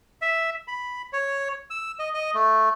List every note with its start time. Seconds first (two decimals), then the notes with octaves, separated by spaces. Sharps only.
0.22 E5
0.68 B5
1.13 C#5
1.70 E6
1.99 D#5
2.14 D#5
2.34 A3